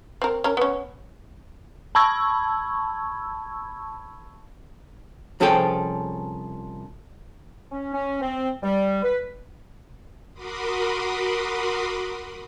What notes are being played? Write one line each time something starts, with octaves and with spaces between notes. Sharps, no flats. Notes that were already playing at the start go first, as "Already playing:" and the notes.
C4 A#4
C#4 A#4
B3 C#4
A5 B5 C#6 E6 G#6
C2 F3 C#4 G#4 A4 G5
C#4
C#4
C4
G3
B4
F#4 A#4 B5 C6 D6 D#6